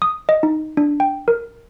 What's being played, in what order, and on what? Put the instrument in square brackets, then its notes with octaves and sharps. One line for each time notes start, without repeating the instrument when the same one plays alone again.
[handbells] D#6
D#5
D#4
D4
G5
A#4